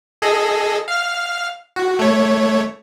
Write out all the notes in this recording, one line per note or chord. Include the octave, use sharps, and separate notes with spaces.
G#4 A4 D#5
F5 F6
F#4
A3 C#5